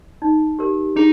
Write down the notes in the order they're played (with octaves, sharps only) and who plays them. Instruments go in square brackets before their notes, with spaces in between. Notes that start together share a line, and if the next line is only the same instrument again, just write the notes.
[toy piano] D#4
G4 A#4
[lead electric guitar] D#4 [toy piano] G#4